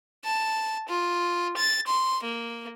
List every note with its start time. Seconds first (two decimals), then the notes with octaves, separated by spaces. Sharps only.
0.24 A5
0.88 F4
1.57 A6
1.87 C6
2.23 A#3